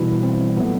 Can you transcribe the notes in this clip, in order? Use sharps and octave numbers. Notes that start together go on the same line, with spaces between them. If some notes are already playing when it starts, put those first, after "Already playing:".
Already playing: B2 E3 G3 E4
C4
A#2 F#3 A3 B3